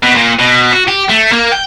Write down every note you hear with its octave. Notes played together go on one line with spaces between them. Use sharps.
B2
A#2
B2
F#4
G4
A3
A#3
G5